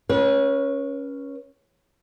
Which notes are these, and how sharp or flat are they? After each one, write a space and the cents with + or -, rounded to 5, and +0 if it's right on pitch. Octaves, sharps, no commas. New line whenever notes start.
C#4 +0 B4 -40